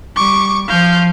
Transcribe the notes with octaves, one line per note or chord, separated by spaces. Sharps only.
G3 C#6 D6
F3 F5 G6